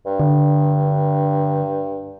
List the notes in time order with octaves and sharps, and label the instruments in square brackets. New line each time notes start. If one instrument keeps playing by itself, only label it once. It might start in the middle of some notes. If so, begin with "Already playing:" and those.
[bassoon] G2
[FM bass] D3